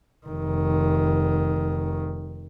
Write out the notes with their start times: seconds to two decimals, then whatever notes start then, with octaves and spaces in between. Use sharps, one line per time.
0.27 F1 D#3